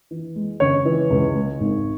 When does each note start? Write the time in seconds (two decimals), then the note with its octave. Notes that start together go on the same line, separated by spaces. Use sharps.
0.11 E3
0.36 G#3
0.60 C#3 C#5
0.85 E3
1.10 C#2
1.35 G#3
1.60 G#1